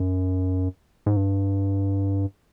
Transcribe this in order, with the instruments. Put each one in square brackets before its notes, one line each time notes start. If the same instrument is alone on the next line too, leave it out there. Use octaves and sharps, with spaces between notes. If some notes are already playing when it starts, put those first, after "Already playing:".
Already playing: [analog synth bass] F#2
G#2
G2